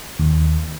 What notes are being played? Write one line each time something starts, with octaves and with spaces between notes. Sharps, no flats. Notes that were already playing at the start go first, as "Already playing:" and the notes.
D#2